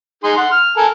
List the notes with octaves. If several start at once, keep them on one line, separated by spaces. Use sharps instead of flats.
D#4 G#4 C6
F#5 C6
F6
A4 A#4 G#5